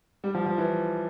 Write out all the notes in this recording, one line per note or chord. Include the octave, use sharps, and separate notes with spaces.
G3
F3
F3
E3